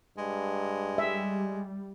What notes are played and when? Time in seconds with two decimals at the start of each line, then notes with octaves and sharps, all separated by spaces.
0.18 G2 G#3
0.98 G3 E5